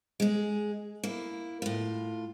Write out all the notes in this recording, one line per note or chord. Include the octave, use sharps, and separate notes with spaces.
G#3 G#4
A#3 E4
A2 F4